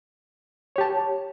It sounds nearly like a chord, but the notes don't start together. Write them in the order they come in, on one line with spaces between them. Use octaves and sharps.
C#5 G4 A5